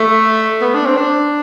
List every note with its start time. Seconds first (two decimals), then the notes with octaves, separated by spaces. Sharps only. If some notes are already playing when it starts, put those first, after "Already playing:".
Already playing: A3
0.62 B3
0.74 D4
0.86 C4
0.97 D4